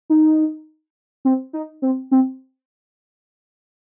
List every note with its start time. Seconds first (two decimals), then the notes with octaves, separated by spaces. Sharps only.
0.10 D#4
1.25 C4
1.53 D#4
1.82 C4
2.11 C4